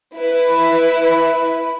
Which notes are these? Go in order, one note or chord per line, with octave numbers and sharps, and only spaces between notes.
E4 B4